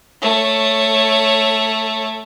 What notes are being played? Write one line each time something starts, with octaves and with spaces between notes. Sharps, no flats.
A3 C#5